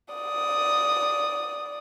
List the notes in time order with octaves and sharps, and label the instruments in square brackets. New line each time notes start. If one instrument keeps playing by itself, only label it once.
[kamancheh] D5 D#6